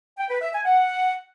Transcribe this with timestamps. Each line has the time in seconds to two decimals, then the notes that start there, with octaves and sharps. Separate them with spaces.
0.18 G5
0.29 B4
0.41 E5
0.53 G#5
0.65 F#5